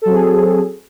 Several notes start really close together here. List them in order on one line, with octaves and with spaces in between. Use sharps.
A4 F#3 C4 G#4